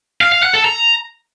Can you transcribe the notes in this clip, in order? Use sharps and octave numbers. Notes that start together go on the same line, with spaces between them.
F5
F5
F#5
A4
A#5